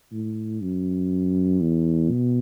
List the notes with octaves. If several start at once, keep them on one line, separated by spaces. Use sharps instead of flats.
A2
F#2
E2
B2